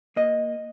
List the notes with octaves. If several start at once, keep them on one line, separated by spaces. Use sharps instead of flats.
A#3 D#5